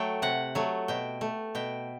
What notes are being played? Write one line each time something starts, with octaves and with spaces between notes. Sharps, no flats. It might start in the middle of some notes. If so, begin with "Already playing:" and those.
Already playing: F#3 A3 G5
C3 F#5
F#3 A3
B2 G5
A3
B2 G5